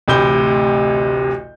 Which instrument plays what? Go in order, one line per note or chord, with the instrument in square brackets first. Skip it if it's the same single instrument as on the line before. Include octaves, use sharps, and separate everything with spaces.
[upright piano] A1 D2 C3 B5 G6 G7